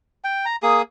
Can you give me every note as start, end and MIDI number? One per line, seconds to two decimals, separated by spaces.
0.24 0.45 79
0.45 0.56 82
0.63 0.82 58
0.63 0.82 68
0.63 0.82 87